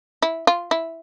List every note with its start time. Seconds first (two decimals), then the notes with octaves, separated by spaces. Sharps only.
0.22 E4
0.47 F4
0.71 E4